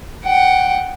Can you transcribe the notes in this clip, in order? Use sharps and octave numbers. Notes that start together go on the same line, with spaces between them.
F#5 G5